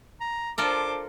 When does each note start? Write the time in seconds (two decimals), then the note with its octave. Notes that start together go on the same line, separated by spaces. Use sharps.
0.21 A#5
0.58 D4 F4 A4 A#4 C5 D6